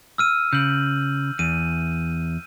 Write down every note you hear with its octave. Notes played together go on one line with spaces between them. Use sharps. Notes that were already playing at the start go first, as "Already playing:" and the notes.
E6 F6 D#7
C#3 G6 F#7
E2 D#7